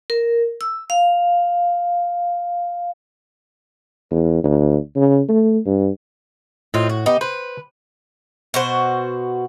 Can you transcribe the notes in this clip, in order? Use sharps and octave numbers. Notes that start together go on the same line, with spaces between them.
A#4
E6
F5
E2
D2
C#3
A3
G2
A2 C4 D#4 F4
F#4
B3 D#4 G4
B4 C5
B2 F#4 C5